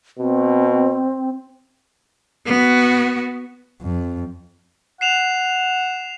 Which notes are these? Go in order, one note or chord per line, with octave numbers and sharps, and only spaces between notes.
B2 C4
B3 F#4
F2
F#5 C7 E7 F7